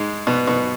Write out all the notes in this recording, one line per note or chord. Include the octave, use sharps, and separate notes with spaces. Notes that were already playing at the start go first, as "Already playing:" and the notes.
Already playing: G#2 G#3
B2 B3
B2 B3